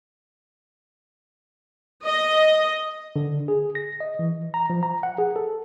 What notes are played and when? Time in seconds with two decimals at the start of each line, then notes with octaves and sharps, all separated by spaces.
2.04 D#5
3.16 D3
3.48 G#4
3.75 A#6
4.00 D#5
4.19 E3
4.54 A#5
4.70 F3
4.83 A#5
5.03 F#5
5.18 G#4
5.36 A4